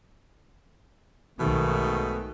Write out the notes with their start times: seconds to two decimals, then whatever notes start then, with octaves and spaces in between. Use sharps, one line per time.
1.39 B1 G#2 B2 D#3 A3